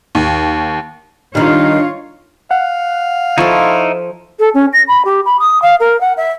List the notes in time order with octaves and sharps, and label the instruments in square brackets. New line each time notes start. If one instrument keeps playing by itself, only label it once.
[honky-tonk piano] D#2
[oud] D#3 G3 [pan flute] D4 [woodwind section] D#4 F5 [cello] F4 C#5
[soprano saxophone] F5 [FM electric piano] F#5
[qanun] F3 A4 [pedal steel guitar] D#4 E4 C#6
[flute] A4
C#4
A#6
B5
G4
B5
D#6
F5
A#4
F#5
E5